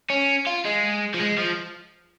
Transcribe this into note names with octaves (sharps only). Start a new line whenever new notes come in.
C#4
F4
G#3
F3
G#3
F3